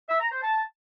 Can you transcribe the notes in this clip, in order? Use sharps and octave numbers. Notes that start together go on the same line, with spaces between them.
E5
A#5
C5
A5